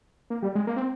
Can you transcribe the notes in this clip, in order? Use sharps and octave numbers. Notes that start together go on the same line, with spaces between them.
A#3
G3
G#3
A#3
C4